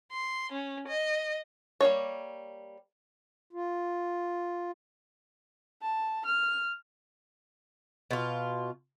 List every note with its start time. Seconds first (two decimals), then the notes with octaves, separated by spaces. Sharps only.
0.12 C6
0.52 C#4
0.87 D#5
1.81 G3 A#3 D#4 C#5
3.53 F4
5.82 A5
6.25 F6
8.11 B2 F4